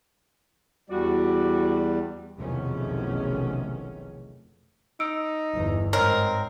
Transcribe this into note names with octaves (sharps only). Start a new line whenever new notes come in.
E2 G3 F#4 D5
F1 B1 E2 D#3 A3 C#4
D#4 E6 D7
G1 E2
G#2 C4 A#4 C#5 D#5 F6